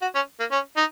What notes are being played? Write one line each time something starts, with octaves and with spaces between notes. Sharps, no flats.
F#4
C#4
A#3
C#4
D#4